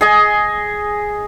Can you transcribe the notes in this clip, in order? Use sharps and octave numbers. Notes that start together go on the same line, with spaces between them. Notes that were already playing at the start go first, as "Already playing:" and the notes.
G#4 D#5 G#5